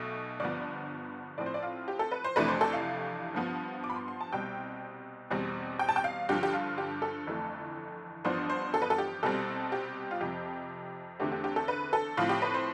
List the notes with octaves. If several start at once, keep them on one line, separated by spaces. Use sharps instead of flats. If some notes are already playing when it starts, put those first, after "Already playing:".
Already playing: B1 B2 A3
G1 G2 F3 B3 D5
A2 F3 C4 D5
C5
D5
F4
G4
A4
B4
C5
F2 C3 E3 A3 D4 B4
C5
A4
F5
G2 F3 B3
D6
B5
C6
C6
A5
C2 B2 G3 C4 G5
E2 B2 G3 C4
G5
A5
G5
F5
G2 D3 F3 G4
G4
F4
G4
A4
G1 F2 E3 A3
A1 G2 F3 B3 D4 C5
C5
A4
B4
A4
G4
C2 B2 G3 C4 A4
G4
F4
F2 C3 F3 G4
E2 D3 A3 C4 G4
G4
G4
A4
B4
A4
A2 F3 C4 F4
G4
B4
C5